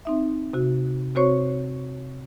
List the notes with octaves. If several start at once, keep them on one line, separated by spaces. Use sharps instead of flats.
C4 D#4 E5
C3 F#4
C3 C4 F#4 C5 C#5 C#6